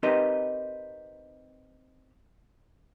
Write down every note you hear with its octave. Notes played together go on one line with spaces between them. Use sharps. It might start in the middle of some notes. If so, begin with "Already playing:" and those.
C4 D#4 G4 A#4 B4 D#5